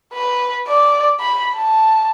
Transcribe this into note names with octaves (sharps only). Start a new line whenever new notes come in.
B4
D5
B5
A5